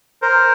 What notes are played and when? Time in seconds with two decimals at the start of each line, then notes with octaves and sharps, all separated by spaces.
0.22 A#4 C5